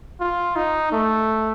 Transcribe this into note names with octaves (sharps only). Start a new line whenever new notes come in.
F4
D#4
A3